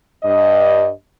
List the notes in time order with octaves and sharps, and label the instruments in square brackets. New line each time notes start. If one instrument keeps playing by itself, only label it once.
[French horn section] G2 D#5